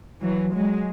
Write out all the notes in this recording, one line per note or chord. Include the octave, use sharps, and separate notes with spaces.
E3 F#3
F#3 G#3